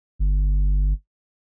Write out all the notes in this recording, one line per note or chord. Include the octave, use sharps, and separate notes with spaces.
G1